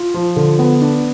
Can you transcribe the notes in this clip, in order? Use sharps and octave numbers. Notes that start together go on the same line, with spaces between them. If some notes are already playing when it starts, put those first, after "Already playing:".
Already playing: F4
F3
D3
B3
D4